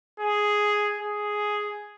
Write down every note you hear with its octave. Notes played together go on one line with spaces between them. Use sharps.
G#4
G#4